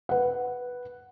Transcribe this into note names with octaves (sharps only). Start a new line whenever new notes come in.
B4 F#5